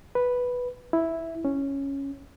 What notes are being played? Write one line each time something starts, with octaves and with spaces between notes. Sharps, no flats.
B4
E4
C#4